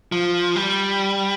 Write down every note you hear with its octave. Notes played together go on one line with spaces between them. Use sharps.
F3
G3